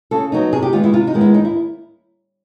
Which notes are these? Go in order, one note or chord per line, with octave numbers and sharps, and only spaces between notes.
C#3 A4
F#3 B3 D#4
C3 G#4
G4
D#3 G#3 B3 F4
E4
C3 F4
D#4
D#3 G#3 B3
E4
D#2 D#4
E4